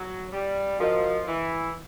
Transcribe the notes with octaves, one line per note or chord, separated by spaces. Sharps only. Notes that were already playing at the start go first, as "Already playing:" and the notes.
Already playing: F#3
G3
F3 F#4 A#4 D#5
E3